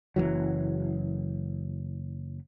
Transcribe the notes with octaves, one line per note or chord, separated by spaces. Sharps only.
F#1 F2 E3 F#3